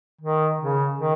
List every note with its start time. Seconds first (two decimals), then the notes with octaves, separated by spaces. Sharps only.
0.21 D#3
0.59 C#3
0.98 D#3